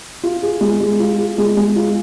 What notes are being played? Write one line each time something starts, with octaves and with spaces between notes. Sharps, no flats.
F4
G#4
G#3
G#3
F4
G#4
G#3
G#3
F4